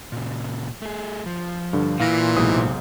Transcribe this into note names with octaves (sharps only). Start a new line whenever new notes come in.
A#2 C#3
A3 G#4
F3
G2 D3
A#2 E3 F5 A#6
B1 G#2 C3 C5 D#6